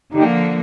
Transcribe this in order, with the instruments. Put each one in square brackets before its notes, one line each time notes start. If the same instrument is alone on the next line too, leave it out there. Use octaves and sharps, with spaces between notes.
[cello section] D3 F3 A#3 [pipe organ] D#4 G4